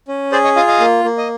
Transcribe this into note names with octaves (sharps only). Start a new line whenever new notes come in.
C#4
G#4 C5 D5
C#5 D#5
F4 D#5 F5
D#5 F5
A#3
A#3
D#5